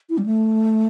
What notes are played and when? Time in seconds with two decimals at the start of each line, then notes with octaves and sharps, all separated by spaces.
0.10 E4
0.18 G3
0.26 A3